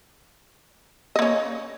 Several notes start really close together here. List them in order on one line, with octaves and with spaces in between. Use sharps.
D#5 A#3 C#4